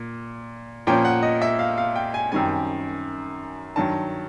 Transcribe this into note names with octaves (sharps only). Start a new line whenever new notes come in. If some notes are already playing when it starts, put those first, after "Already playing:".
Already playing: A#2
A#2 F3 A#3 C#4 G5
F#5
D#5
E5
F5
F5
G5
G#5
F#2 D#3 G3 C4 G#5
G2 D#3 F#3 A5